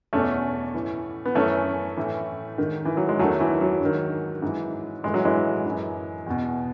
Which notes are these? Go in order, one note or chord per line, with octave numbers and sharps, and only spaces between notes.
E2 B2 A3 C#4
A2 E3
B3
F#2 E3 A3 C#4
A2 E3
G#2 D#3
E3
F#3
G#3
E2 D#3 F#3 A3
E3
F#3
G#2 D#3
G#2 E3
A2 E3 G#3
F#3
E3 G#3
F#2 E3
E2 B2